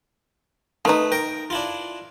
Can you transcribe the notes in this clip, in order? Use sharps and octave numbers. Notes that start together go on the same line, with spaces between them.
D#3 A3 D#4 B4
A#4 G5
D4 E4 F4